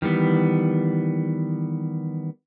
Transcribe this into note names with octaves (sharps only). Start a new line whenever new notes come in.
D#3 E3 G3 B3